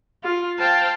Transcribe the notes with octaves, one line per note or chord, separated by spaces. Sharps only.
F4
C5 F5 G5 A5